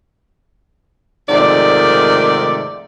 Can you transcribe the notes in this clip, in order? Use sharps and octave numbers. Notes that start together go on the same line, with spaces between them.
G#2 C3 D#3 F3 A3 D5